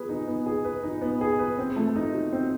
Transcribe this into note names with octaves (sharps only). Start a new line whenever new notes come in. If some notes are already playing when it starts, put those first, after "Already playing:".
Already playing: B3 G#4 B4
D#4
B3
G#4
B4
D#4
B3
G#4
B4
C4
A3
D#4
F#4
C4